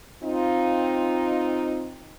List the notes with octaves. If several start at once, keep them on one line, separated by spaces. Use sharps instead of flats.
C4 D#4 F4